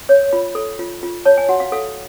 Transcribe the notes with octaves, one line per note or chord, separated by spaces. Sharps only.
C#5
F4 B5
A4
F4
F4
C#5 A5
G#5
F#4 F#5
F5
A4 F5